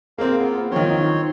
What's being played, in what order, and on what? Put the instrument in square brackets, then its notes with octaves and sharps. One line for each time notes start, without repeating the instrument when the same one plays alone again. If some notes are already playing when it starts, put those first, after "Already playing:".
[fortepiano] A#3 C4 [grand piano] G#4 [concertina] A#4 F5 A#5
[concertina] B3 F4
[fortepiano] D#3 F3 [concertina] C4 C#5 C6
[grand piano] D#4